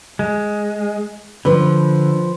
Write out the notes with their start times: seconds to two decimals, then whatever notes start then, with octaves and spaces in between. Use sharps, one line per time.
0.19 G#3
1.45 D3 F3 B4